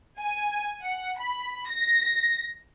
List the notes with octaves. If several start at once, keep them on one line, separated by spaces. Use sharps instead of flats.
G#5
F#5
B5
A#6